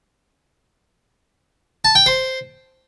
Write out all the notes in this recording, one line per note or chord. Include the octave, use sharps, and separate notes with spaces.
A5
G5
C5